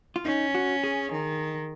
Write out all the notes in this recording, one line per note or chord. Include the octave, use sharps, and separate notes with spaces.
F4
C#4 D#4
F#4
G#4
D#3